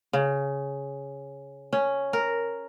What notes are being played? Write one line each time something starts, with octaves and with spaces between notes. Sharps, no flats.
C#3
C#4
A#4